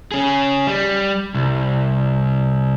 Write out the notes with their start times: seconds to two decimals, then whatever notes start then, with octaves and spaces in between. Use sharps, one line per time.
0.12 C#4 G#4
0.67 G3
1.34 C2